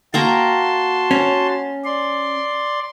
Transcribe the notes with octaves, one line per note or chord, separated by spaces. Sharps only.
A#3 F#4 G5 A5 A#5 C6
C#4
D5 C6